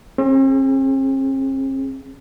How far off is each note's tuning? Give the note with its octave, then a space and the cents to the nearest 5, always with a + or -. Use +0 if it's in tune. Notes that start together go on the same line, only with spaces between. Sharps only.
C4 +45 G#4 +0